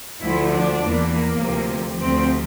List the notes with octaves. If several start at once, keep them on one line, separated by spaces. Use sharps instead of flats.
D2 D3 F3 A3 E4
D4
E2 E3 A#3
A#3
D2 C3 F3
D2 C3 F3 A3 C4